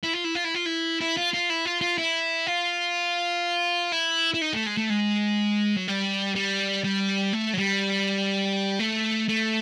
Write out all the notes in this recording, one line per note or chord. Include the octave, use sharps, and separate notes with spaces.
E4
F4
E4
F4
E4
F4
E4
E4
F4
F4
E4
F4
F4
E4
F4
E4
E4
D#4
A3
G#3
A3
G#3
F#3
G3
G3
G3
A3
F#3
G3
A3
A3